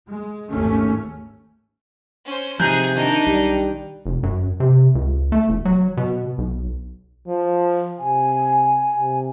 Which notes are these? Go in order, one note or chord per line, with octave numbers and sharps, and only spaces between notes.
G#3
G#1 D#2 G#2 A3 C#4
C#4 C5
C3 F3 D#4 G#4 A#5 F#6 G6
D#3 D4 D#4
B1 G3
F1
F#2
C3
C#2
A3
E1
F#3
B2
B1
F3
C3 G#5
C3